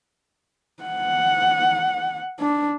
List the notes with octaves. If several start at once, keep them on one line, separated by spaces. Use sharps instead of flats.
F#5
D4